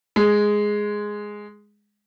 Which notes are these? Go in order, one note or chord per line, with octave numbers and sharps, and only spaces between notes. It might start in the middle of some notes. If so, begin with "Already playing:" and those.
G#3